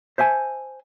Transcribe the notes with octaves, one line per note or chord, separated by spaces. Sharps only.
C5 E5 F5 G#5 A5